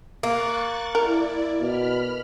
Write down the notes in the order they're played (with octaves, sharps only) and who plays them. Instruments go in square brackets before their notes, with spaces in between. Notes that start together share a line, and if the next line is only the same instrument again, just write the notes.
[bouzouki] A#3 [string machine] C#6 F#6 A6
[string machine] E4 D5 [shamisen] A#4
[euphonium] B2 [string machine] B5 F6